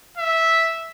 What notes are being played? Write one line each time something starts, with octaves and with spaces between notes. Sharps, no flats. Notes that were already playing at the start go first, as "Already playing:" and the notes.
E5